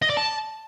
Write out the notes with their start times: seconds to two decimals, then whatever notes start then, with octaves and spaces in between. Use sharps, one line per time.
0.02 D#5
0.10 D5
0.17 A5